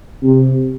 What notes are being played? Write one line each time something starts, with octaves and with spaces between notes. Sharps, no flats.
C3